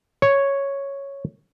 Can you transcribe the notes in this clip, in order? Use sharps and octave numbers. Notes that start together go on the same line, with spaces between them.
C#5